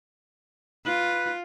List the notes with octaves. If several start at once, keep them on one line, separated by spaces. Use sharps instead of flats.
F4 B4